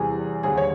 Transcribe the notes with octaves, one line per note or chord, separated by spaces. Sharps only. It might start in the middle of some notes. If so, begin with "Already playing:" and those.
Already playing: E2 C3 E3 G3 G#4
D#2 D3 G3 G#4
C#5